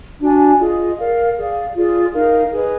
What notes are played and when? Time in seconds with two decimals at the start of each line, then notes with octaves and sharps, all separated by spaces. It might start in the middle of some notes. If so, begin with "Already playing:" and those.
0.21 D4 F#4 D5 G#5
0.60 F4 G#4 D#5
0.98 A#4 D5 F5
1.36 G#4 D5 F5
1.75 F4 G#4 D5
2.13 D#4 A#4 F5
2.52 G#4 B4 D#5